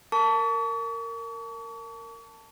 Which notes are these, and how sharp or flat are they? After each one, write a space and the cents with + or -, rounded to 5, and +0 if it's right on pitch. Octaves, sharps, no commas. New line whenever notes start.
A#4 -20 A5 +10 C#6 +40